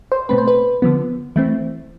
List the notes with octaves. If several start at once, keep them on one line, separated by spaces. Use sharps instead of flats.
C5
B2 A3 C4 B4
C5
B4
D3 F3 B3
E3 A3 C4 E4